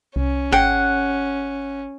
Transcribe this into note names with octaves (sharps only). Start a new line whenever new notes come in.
C2 C#4
G#1 G#4 F#5 G5